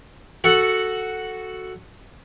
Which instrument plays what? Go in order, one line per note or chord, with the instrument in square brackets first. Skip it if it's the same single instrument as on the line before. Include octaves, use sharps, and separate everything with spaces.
[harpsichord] F#4 A4 F#5